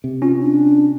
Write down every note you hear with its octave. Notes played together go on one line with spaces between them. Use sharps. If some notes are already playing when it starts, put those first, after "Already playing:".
C3
C#4 F4
D4